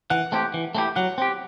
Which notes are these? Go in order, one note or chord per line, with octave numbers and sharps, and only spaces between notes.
E3 F#5
A3 C4 E4 G4
E3
A3 C4 E4 G4
F#3 F#5
C4 G4